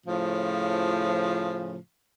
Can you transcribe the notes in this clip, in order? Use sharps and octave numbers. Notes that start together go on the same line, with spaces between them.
A2 C#3 F3